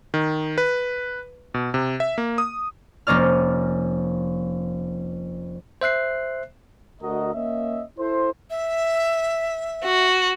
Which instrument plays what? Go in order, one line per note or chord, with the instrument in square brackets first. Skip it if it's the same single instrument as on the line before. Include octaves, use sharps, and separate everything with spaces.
[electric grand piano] D#3
B4
B2
C3
E5
A#3
D#6
[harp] F1 A#3 C#4 D5 F6
[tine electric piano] C5 E5 F#6 C7
[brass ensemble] D2 F#4 A#4 D#5
A#3 C#4 D#5 E5
E4 A4 C5
[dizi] E5
[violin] F#4